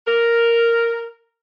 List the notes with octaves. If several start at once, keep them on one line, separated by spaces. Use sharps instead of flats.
A#4